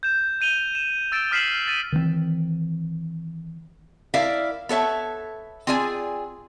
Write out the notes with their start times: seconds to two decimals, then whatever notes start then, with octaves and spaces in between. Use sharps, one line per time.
0.03 G6 E7
0.41 G6 D#7 F7 G7
0.75 E7
1.12 E6 A6 D7 E7
1.31 D#6 F6 B6 C7 E7 F#7
1.68 A6 D#7
1.92 D#3 E3 A3 C4
4.14 E4 A#4 D5 E5 F5
4.69 B3 A4 C#5 E5
5.67 C4 F4 G#4 D5 G#5